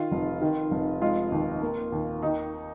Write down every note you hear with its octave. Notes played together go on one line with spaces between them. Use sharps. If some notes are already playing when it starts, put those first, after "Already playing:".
Already playing: D#3 F4
F1
D#3
F1
G#3 F4
D#2
A#3
D#2
D#3 D#4